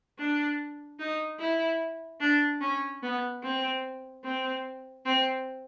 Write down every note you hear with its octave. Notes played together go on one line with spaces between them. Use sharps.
D4
D#4
E4
D4
C#4
B3
C4
C4
C4